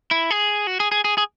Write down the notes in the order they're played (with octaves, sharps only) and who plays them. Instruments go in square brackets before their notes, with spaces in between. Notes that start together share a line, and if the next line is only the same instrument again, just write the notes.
[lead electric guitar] E4
G#4
F#4
G#4
G#4
G#4
G#4